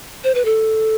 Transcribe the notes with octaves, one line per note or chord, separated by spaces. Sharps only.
C5
B4
A4